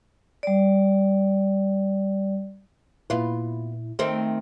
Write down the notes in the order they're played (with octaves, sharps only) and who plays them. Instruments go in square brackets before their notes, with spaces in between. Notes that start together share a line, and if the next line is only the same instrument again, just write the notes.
[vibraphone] G3 D5
[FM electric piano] A#2 E4 [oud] B3 F4
[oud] D#3 A3 C4